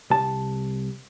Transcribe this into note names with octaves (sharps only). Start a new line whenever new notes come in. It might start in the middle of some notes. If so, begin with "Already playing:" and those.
C2 A5